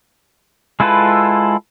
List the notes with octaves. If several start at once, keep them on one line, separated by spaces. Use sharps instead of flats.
G#3 E4 F4 A4 B4